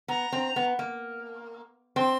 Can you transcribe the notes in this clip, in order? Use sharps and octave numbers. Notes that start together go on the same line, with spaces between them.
B3 A#5
C4
B3
A#3
C4 C6